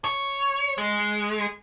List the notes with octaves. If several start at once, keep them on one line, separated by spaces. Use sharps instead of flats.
C#5
G#3